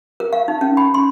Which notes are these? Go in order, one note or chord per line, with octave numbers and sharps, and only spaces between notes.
A#4
F5
D#4
C#4
B5
C6